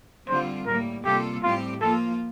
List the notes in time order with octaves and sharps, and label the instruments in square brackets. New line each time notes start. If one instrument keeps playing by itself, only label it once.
[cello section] D3 G3 C4 F4 [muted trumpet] C5
[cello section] A2 G3 A#3 [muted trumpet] A#4
[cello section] C3 G3 A#3 F4 A4 [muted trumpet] G4
[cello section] A2 G3 C4 G4 [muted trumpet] F4
[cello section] F3 A#3 F4 [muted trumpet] A4